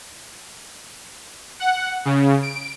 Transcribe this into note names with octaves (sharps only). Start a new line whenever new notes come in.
F#5
C#3
D7